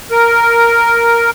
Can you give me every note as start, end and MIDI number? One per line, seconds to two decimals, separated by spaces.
0.11 1.30 70